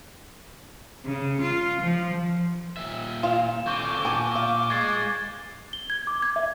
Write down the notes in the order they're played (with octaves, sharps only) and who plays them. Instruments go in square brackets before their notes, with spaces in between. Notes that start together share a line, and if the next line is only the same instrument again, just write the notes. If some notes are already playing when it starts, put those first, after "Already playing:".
[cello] C#3
F4
F3
[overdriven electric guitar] A#2 E5
[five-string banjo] F4 F5 [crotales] E7
[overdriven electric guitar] D3 C4 [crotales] C#6 G6 G7 [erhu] D6
[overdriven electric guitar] A#2 [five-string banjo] B3 G#5 A5
[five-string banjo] F5 [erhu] D6
[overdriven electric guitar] G#3 [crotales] G#6 A6 C7
[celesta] G7
G#6
D6
G#6
E5